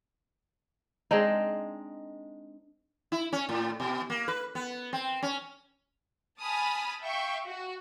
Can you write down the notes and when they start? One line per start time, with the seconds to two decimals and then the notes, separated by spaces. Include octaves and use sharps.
1.11 G#3 C4 D4 D#4
3.12 E4
3.33 C#4
3.49 A2
3.80 B2
4.10 A#3
4.28 B4
4.55 B3
4.93 C4
5.23 C#4
6.42 G#5 A5 B5 D#6 F6
7.02 E5 F5 G5 C#6
7.48 F#4